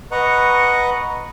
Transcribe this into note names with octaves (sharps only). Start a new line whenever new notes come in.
B4 D#5 F#5 A#5 C#6 F#6